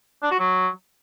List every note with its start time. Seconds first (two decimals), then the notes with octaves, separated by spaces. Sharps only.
0.22 D4
0.31 F#4
0.40 F#3